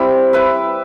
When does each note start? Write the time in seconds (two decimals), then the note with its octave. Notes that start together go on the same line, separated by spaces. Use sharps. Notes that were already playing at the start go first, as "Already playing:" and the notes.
Already playing: G3 C4 E4
0.33 E4 B4 E5